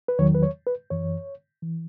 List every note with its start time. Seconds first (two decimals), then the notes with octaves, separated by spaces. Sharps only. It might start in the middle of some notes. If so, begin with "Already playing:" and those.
0.08 B4
0.19 E2 D#3 F#3 C#5
0.34 B4
0.43 C#5
0.67 B4
0.90 F#2 E3 C#5
1.62 E3